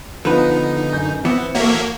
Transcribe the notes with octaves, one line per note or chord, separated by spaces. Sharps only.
D3 F3 B3 D#4 B4
A1 F#2 G6
E3 B3 C4 C#7
A#3 F#4 A4 C#5 E5